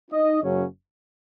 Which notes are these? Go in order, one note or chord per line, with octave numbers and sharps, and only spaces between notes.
D#4 D#5
F#1 F#2 C#3 F#3 C#4